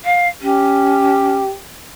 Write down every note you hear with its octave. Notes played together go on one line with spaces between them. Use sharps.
F5
C#4 G4